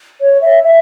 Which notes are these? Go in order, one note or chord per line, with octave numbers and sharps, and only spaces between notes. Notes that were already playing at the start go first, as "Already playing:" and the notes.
C#5
E5
E5